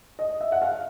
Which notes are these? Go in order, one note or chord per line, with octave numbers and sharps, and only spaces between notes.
D#5
E5
F#5
F5